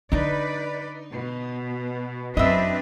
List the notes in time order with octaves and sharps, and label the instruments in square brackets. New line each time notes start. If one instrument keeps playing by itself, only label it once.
[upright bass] D3 D4 [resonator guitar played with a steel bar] D#4 [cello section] B4 D5
[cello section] B2
[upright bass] F#2 E4 [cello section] C4 D4 B4 [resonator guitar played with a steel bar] D#5 E5